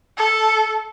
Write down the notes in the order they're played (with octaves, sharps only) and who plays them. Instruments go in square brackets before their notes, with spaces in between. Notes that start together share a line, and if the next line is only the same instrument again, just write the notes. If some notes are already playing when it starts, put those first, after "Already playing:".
[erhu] A4